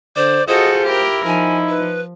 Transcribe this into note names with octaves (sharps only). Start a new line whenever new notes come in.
D3 C5 D5
F4 F#4 G#4 A4 C5 D#5
E4 G4 A#4
F3 D#4 G#5
B4